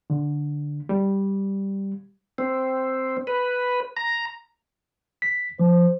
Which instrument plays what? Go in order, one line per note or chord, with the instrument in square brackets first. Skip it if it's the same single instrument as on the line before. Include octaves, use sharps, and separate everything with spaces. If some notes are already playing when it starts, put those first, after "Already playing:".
[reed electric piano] D3
G3
[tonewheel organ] C4
B4
A#5
[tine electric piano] B6
[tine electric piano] F3 [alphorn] C5